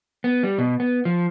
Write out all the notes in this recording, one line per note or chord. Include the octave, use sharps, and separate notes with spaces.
B3
G3
B2
B3
F3